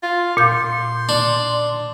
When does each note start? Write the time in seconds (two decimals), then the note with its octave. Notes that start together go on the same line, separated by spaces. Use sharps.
0.03 F4
0.37 A#2 C6 G6
1.09 D4